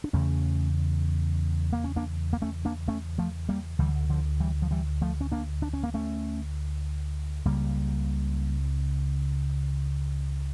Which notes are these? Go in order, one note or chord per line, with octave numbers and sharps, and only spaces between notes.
D4
E2 C#3 A3 C#4
A#3
C#4
A#3 D4
A#3
A3 C#4
A#3 D4
A3 C#4
F3 A3
G3 A#3
D2 D3 E3 G3
D3 F3
E3 G3
F3
E3 G3
F3 A3
C#4
A#3 D4
D4
C#4
A#3
A3 C#4
C#2 C#3 G3 A#3